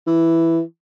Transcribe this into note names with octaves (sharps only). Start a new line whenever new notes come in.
E3